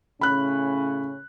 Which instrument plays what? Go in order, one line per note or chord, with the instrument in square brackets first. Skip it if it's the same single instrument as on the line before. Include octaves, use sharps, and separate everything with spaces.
[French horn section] A2 C#3 C#4 [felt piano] B5 F#6